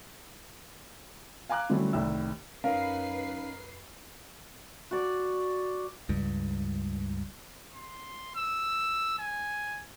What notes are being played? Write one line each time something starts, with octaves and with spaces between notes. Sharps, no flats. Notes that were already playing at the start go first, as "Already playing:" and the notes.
F5 G#5 A#5 D6 F#6
D3 E3 F#3 G3 A3 C#4
C2 A2 D#3 E5 E6
F#2 C#4 D#4 A#4 B4 F5 C7
F#4 D5
C#2 G2
C6
E6
G#5